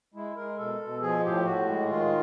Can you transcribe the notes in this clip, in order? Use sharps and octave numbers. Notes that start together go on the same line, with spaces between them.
G#3 E4
G#3 A#4
B2 A4
B2
F3 G#4
A2 G4
A2 F#4
G#3
D#3 F4